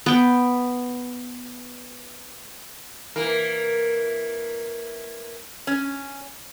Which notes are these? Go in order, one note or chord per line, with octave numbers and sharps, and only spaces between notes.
B3 G5
E3 A#3 A#4
C#4